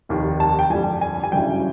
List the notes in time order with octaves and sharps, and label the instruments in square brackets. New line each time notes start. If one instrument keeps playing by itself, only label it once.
[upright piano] F1 D#2 D#3
A5
G5
G1 F2 D3 G3 G#5
G#5
G#5
G1 F#2 C#3 E3 G5